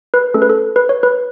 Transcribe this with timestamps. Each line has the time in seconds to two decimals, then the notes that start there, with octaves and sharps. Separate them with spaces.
0.14 B4
0.34 A3 C#4 G#4 A4
0.42 B4
0.50 A4
0.76 B4
0.89 C#5
1.03 B4